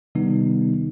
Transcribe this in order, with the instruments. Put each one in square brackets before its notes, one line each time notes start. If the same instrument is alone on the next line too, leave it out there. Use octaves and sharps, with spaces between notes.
[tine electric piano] C3 D#3 G3 B3 D#4